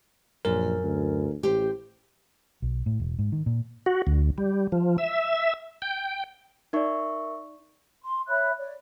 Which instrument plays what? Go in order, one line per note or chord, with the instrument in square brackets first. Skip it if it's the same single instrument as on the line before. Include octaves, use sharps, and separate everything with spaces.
[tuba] A#1 [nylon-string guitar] F#2 [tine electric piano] A#4
[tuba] D2
[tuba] A1 [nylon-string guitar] G4 C5
[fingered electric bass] B1
A2
E1
G#2
D#3
A#2
[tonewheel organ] F#4
D2
G3
F3
E5
G5
[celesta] D#4 D5 [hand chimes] A#4 E5 C#6
[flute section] C6
C#5 E5 B5 F#6
C#5 D5